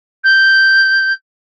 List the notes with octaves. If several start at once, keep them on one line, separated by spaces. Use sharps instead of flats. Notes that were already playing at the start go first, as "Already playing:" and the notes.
G6